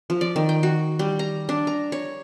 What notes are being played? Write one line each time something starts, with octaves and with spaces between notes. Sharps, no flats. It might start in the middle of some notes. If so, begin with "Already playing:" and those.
F3
D5
D#3
G5
F#4
G3
A#5
D4
A#5
C#5